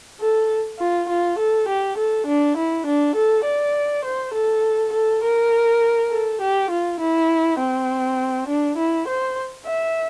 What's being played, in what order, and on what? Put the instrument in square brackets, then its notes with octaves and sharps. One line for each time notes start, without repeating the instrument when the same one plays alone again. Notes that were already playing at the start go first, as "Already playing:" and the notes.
[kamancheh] A4
F4
F4
A4
G4
A4
D4
E4
D4
A4
D5
C5
A4
A4
A#4
A4
G4
F4
E4
C4
D4
E4
C5
E5